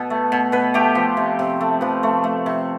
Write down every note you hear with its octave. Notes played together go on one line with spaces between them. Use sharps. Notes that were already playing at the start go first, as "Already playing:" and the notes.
Already playing: B2 A4
A3
B2
B2 B4
A3 G4
F3
C3
C3
A3
F3 B4
A3
A3
C3